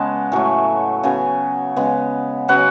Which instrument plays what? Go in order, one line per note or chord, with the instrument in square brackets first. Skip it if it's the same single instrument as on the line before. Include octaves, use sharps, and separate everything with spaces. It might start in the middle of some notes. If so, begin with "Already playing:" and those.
Already playing: [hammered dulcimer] C#3 G#3 B3 A5
A2 F#3 A3 G#5
C#3 F#3 B3 G#5
C#3 G#3 B3
C#3 F#3 B3 F#5